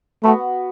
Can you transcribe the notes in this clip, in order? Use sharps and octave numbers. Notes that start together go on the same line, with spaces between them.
A3 B3 F#4 B4